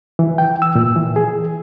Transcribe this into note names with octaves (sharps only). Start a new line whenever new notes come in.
E3
G5
E6
A#2
E3
G#4